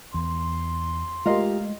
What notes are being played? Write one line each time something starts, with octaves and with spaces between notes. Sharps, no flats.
E2 C6
G#3 A3 F4 G4 A#4 D#5 F5